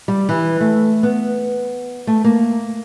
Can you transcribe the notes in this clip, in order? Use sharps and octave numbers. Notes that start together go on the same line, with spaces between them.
G3
E3
A3
B3
A3
A#3